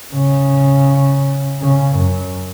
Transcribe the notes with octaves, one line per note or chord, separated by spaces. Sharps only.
C#3
C#3
F#2